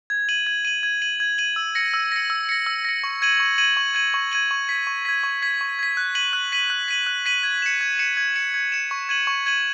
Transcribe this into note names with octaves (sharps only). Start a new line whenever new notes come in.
G#6
D#7 F#7
G#6
D#7 F#7
G#6
D#7 F#7
G#6
D#7 F#7
E6
A#6 C#7
E6
A#6 C#7
E6
A#6 C#7
E6
A#6 C#7
C#6
G#6 D#7 F#7
C#6
G#6 D#7 F#7
C#6
G#6 D#7 F#7
C#6
G#6 D#7 F#7
C#6
G#6 B6
C#6
G#6 B6
C#6
G#6 B6
C#6
G#6 B6
F#6
B6 D#7 F#7
F#6
B6 D#7 F#7
F#6
B6 D#7 F#7
F#6
B6 D#7 F#7
G#6
C#7 E7
G#6
C#7 E7
G#6
C#7 E7
G#6
C#7 E7
C#6
G#6 D#7 F#7
C#6
G#6 D#7 F#7